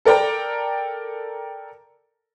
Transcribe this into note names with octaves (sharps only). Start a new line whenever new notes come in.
A4 A#4 D5 G5 A#5